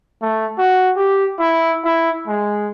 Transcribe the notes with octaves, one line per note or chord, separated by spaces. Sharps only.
A3
F#4
G4
E4
E4
G#3